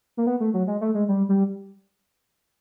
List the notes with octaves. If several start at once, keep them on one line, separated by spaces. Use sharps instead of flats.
A#3
B3
A3
F#3
G#3
A3
G#3
G3
G3